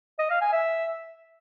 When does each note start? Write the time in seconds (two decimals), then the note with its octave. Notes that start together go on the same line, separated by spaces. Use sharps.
0.19 D#5
0.30 F5
0.41 G#5
0.52 E5